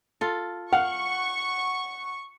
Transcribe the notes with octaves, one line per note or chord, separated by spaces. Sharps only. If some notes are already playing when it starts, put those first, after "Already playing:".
F4 A4
F5 F#5 C#6